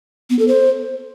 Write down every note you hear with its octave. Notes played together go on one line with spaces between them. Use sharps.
B3
A4
C5